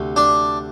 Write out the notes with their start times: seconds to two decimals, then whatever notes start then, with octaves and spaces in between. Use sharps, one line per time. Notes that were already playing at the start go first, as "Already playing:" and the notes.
Already playing: D2 C3
0.16 D4